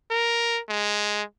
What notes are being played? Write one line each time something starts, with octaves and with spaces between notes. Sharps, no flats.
A#4
G#3